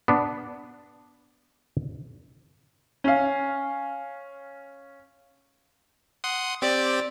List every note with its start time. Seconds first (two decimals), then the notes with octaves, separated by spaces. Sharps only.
0.08 B3 D4
3.04 C#4 F5
6.24 F#5 C6 D#6
6.62 C4 G4 D5